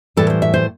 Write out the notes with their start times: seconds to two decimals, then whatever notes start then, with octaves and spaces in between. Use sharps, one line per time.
0.17 A2 E3 G3 A4
0.30 C5
0.42 E5
0.54 C5